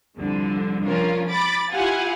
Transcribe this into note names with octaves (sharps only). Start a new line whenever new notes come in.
C2 D3 F3
F3 C#4 D4 F4 A#4
B5 D6 A6
E4 F4 G4 F5 F#5 G#5